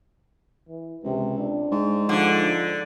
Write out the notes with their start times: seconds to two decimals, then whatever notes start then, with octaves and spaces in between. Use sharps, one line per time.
0.68 E3
1.04 C#2 C3
1.38 D4
1.72 G#2
2.09 D3 F3